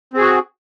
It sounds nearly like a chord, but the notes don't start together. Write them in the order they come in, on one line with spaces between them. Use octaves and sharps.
C4 G#4 F#4